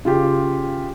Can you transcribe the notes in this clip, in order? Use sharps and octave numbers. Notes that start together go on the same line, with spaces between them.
C#3 F4 G4